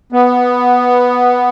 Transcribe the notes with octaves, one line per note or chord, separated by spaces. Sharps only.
B3